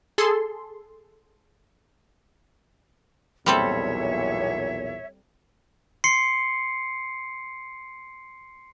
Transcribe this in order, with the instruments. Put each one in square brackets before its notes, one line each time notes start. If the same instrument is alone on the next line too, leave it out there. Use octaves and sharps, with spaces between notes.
[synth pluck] G#4 A4 C6
[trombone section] B1 E2 A#2 [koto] G3 C4 A4 [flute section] C#5 E5
[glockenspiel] C6 C7 C#7